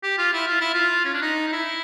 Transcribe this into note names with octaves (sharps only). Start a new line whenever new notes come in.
G4
F4
E4
F4
E4
F4
C#4
D4
D#4
D#4
E4